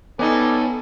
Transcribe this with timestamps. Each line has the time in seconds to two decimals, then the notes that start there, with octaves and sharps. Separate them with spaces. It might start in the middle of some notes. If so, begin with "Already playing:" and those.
0.19 G3 B3 C#4 D#4 A4 D5 G#5